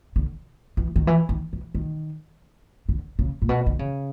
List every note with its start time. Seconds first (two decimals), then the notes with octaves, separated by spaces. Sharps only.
0.16 D3
0.77 E3
0.96 D#3
1.07 E3
1.29 D#3
1.53 E3
1.75 D#3
2.89 D3
3.19 C#3
3.42 A#2
3.49 B2
3.66 D3
3.79 C#3